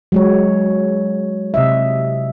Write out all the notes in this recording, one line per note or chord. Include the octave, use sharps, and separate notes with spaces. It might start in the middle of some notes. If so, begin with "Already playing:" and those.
F#3 G#3 C#5
C3 D#5 E5